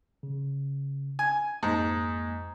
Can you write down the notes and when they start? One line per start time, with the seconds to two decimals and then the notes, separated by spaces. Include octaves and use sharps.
0.23 C#3
1.19 G#5
1.63 F2 G#2 A#3